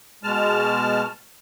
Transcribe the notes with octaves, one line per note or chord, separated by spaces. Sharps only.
B2 G#3 A5 F6